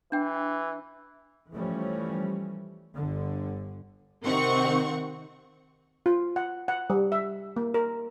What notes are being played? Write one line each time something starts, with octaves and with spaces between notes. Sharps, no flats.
E3 D4 G5
E3 F3 G3 A3 C#4
G1 D3
C3 D#3 C4 F#5 C#6
F4
F#5
F#5
G3
E5
A#3
A#4